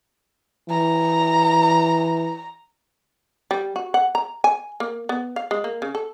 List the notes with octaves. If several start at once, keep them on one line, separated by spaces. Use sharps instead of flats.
E3 A#5
G3
F#4
F#5
A#5
G#5
A#3
B3
F5
G#3
A#3
C#3
A4